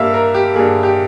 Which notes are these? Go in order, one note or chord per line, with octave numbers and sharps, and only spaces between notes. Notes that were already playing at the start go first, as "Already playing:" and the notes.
Already playing: G2 G3 A#3 E5 F5
A#4
G4
G2 G3 A#3 G#4
G4